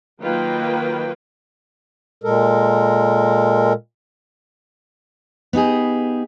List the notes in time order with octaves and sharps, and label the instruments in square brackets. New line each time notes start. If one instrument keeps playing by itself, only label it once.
[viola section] D#3 F#3 A#3 F4 B4 G5
[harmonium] A#2 G#3 A4 A#4
[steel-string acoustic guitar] B3 D#4 G4 G#4